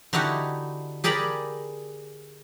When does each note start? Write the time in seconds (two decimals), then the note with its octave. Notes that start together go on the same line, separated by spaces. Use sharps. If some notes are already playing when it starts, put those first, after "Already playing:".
0.13 D3 D#4 E4 F#4 G4
1.04 G4 G#4 A#4 D5 B5